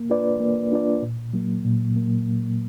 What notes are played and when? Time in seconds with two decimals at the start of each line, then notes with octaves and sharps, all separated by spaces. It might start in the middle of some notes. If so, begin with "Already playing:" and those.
Already playing: A#3
0.10 D4 F4 B4 D5
0.40 A#3
0.72 D4 F4 B4 D5
1.02 A#2
1.34 F#3 A#3
1.65 A#2
1.95 F#3 A#3